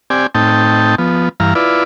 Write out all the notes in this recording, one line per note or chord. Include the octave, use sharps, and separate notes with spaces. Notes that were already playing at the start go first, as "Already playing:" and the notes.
C4 G4 D5 G#5
A2 C4 D#4 G5 A5
F3 B3
G2 E3 F5 A#5
E4 F4 B4 D5